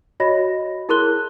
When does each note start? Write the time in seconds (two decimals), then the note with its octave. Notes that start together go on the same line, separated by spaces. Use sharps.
0.20 F#4 C#5 D#5 B5 A#6
0.89 E4 G#4 A#4 C6 F#6 G7